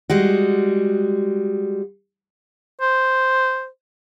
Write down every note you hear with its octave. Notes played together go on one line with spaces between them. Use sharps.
G3 G#3 F#4
C5